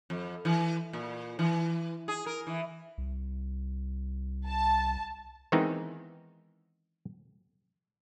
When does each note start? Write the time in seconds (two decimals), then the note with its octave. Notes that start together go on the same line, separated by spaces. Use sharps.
0.10 F2
0.45 E3
0.93 A#2
1.39 E3
2.08 G#4
2.26 A#4
2.47 E3
2.98 C2
4.47 A5
5.52 D#3 E3 G#3 B3 C4 D#4